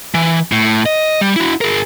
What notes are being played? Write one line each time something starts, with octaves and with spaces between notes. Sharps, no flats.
E3
A2
D#5
G3
E4 F#4
G#4 A#4